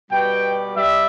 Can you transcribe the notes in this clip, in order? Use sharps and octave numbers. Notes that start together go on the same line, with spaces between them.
B2 G3 G5
G3 E5